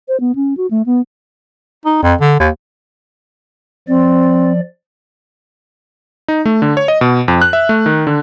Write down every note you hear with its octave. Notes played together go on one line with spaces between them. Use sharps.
C5
B3
C#4
F#4
A3
B3
D#4
F2
D3
D#2
F3 C4 D5
D#4
A3
D3
C#5
D#5
B2
F2
F#6
E5
A3
D#3
D3